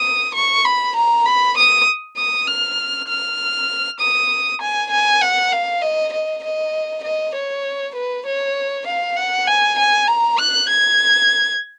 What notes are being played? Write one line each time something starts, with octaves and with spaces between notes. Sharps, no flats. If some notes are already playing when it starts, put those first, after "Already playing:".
Already playing: D#6
C#6
B5
A#5
B5
D#6
D#6
F6
F6
D#6
G#5
G#5
F#5
F5
D#5
D#5
D#5
D#5
C#5
B4
C#5
F5
F#5
G#5
G#5
A#5
F#6
G#6